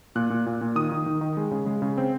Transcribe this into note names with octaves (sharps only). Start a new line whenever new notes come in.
A#2 F#6
A#2
A#2
A#2
D#3 D#6
D#3
D#3
D#3
G#3
C#3
G#3
C#3
C4